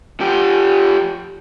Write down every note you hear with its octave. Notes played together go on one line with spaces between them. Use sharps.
F3 G4